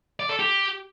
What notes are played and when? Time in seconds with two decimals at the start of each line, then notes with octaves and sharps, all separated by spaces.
0.20 D5
0.29 A4
0.39 G4